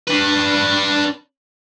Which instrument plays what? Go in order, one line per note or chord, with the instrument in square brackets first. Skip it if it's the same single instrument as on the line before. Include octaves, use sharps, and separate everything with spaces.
[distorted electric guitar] D4 B4